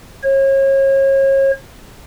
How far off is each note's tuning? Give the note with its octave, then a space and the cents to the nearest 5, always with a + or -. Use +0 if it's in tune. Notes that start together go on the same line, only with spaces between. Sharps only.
C#5 -35